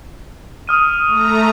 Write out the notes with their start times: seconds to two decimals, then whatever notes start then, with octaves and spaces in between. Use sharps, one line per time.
0.68 D#6 F6 D#7
1.08 A3 A#5 C#6